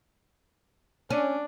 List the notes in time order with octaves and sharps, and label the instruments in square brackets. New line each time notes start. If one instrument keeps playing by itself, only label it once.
[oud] C#4 [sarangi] D4